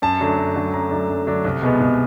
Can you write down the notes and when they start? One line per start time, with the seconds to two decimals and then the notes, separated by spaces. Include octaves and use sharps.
0.02 F#2 A5
0.20 D3 F#3 A3 D4
0.38 F#2
0.56 D3 F#3 A3 D4
0.73 F#2 A#5
0.91 D3 F#3 A3 D4
1.09 F#2
1.26 D3 F#3 A3 D4
1.44 C2
1.62 B2 G#3 B3
1.80 C2